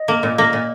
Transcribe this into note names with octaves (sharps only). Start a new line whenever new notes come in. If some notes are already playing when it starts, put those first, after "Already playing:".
Already playing: D#5
A#3
A#2
A#3
A#2